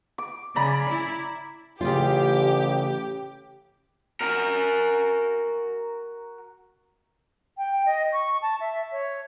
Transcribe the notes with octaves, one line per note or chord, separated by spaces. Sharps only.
D6
C#3 D5 A#5 B5
E4
A1 C#3 F4 G4
F#4 A#4
G5
D#5
C#6
A5
E5
C#5